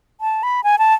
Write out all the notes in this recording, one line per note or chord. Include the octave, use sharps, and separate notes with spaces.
A5
B5
G#5
A5